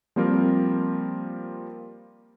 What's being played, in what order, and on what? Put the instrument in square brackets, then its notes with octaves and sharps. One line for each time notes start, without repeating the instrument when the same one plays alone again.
[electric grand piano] F3 G3 A#3 C4 F4 A#4